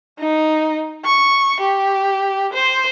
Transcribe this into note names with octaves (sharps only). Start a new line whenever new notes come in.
D#4
C#6
G4
C5